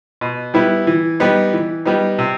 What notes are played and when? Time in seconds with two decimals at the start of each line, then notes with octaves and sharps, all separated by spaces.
0.21 B2
0.54 G3 B3 E4
0.87 E3
1.20 G3 B3 D#4
1.53 E3
1.85 G3 B3 D#4
2.19 C3